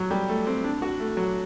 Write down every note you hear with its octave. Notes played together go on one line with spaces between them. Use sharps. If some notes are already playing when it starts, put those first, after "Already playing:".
Already playing: F#3
G3
A3
C4
D4
F#4
A3
F#3